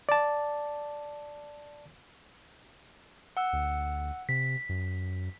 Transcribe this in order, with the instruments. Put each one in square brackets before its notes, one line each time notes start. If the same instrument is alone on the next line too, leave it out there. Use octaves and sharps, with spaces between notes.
[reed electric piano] D5 A5
[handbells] F#5 E6
[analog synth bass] D2
[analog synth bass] C3 [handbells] B6
[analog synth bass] F#2